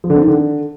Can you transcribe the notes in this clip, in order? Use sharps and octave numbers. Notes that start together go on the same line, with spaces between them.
F3
D3
C4
D#3
D3